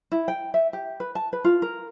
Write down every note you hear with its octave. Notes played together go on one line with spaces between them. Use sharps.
E4
G5
E5
G4
B4
A5
B4
F4
A#4